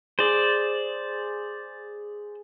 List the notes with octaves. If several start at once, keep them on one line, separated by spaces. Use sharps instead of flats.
G#4 C5 D5